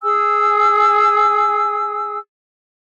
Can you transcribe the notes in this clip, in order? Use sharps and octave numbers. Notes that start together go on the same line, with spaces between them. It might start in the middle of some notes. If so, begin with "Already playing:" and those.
G#4 G#5 E6